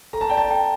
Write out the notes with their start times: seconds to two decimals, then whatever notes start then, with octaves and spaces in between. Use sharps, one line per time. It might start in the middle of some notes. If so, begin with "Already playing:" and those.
0.13 A4 A#5
0.21 A5
0.29 D5 G5
0.37 A5
0.51 G5